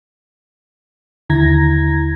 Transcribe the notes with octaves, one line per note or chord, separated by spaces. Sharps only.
D#2 D3 E4 A#5 G#6 A#6